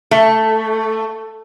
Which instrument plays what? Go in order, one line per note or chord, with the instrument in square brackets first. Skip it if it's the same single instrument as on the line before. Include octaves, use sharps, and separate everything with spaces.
[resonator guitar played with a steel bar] A3